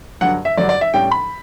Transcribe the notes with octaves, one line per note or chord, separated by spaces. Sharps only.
G2 D3 F#3 F#5
E5
G2 D3 F#3 D5
D5
E5
A2 G3 C#4 G5
B5